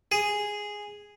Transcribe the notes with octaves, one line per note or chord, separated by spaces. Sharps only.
G#4